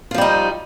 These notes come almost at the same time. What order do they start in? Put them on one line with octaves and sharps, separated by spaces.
F4 F3 G3 D#4